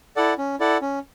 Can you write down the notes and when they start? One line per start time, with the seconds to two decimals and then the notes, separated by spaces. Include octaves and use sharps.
0.16 E4 A4 D5 F#5
0.38 C#4
0.60 E4 A4 D5 F#5
0.82 C#4